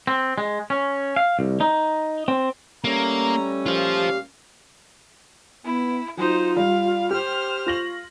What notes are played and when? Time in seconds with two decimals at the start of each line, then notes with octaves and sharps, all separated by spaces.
0.07 C4
0.38 G#3
0.70 C#4
1.16 F5
1.39 C2
1.61 D#4
2.28 C4
2.84 G3 A3 A#3 C#4 A#5
3.66 A#2 F4 G4 C5 F5
5.65 B3 E4
6.17 F#3 D#4 F4 C5
6.57 G3 F5
7.11 G4 C5 F6
7.66 F4 C#6 A#6 F#7